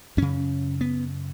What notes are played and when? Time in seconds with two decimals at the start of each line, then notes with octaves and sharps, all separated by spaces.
0.17 F#2 C#3 C#4
0.81 B3